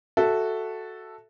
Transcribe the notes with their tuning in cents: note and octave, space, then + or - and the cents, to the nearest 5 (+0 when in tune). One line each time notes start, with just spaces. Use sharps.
F#4 +0 A4 +0 E5 +0